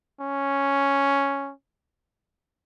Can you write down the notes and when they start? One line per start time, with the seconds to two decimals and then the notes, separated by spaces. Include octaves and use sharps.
0.21 C#4